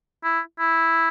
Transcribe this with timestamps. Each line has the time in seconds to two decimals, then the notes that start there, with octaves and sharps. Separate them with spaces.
0.24 E4
0.60 E4